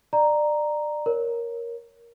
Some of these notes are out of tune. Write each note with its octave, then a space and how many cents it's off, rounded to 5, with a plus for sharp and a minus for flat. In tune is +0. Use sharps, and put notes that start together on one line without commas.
D5 +25 A#5 +0
A#4 +10 C#5 +0